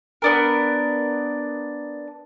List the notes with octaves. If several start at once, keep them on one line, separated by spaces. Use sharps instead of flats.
B3 D4 A#4